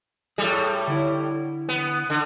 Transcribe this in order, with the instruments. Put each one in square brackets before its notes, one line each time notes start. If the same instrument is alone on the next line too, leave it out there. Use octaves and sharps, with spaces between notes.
[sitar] A2 G3 [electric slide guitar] G#4 A4
[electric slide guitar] D3 E4
[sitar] B3
D3